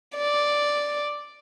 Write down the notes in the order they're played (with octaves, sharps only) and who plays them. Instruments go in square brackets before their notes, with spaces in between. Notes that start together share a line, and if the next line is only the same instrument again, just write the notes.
[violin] D5